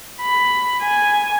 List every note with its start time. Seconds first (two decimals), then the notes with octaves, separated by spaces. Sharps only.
0.21 B5
0.82 G#5